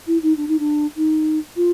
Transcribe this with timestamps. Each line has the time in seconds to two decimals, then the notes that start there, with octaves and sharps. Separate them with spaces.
0.06 E4
0.22 D#4
0.36 D4
0.48 D#4
0.58 D4
0.96 D#4
1.56 F4